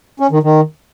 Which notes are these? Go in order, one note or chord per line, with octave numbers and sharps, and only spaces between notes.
C#4
D#3
D#3